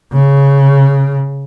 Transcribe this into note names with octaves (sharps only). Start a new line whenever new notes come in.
C#3